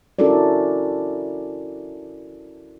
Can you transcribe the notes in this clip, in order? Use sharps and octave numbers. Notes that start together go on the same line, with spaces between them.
C#4 E4 F#4 A4 A#4 D5